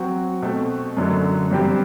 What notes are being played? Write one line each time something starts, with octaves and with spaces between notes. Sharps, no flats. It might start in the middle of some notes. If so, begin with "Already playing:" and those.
Already playing: F#3 C4 F#4
B2 A3 C4
F#2 D3 F#3 A3
G2 F#3 C4 G4